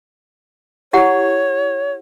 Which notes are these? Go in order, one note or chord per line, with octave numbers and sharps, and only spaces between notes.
E4 G4 C#5 F#5